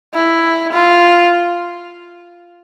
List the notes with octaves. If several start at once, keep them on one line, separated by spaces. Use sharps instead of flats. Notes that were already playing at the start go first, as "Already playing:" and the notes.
E4
F4